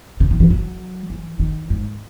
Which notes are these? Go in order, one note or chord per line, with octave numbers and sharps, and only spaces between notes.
C#3
D#3
E3
F#3
E3
D#3
G#2